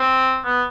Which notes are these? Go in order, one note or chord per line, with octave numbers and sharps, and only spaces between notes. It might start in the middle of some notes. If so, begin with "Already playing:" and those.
Already playing: C4
B3